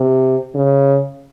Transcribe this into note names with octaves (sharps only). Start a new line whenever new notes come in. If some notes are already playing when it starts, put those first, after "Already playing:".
Already playing: C3
C#3